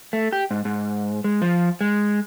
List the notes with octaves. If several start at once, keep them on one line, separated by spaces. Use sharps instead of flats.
A3
G4
G#2
G#2
G#3
F3
G#3